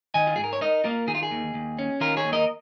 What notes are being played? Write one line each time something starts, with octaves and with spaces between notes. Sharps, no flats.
D#3 D#5 G#5
F4
G#2 G#4
A#4
C#5
D#4 A#4 D#5
A#3 F4 A#4
D#3 G#4
F4
G#4
D#2
D#2
C#4
D#3 F4 A#4
G#4 C#5
D#2
A#4 D#5